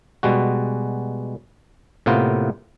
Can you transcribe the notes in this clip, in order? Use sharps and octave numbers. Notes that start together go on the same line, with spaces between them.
B2 G3 G#3 F#4
A2 C3 A#3 B3 F4